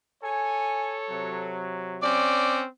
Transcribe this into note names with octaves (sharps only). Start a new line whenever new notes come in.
A4 C#5 G#5
C3 F#3
C4 C#4 D5